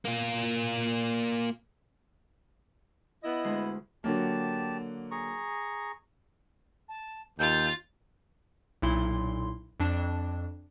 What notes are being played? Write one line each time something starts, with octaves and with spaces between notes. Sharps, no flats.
A#3 F4
B3 E4 D#5
D2 G#3 C6
D3 F#3 A#3 G4 A5
G#4 A#5 C#6
A5
D#2 F4 G6 A6
B1 A#2 E4 C6
F2 D4